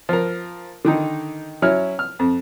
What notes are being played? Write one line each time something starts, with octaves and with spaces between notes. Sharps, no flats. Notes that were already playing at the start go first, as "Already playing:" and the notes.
F3 A#4
D3 D#3 D#4
F#3 C#4 E4 F6
F6
F2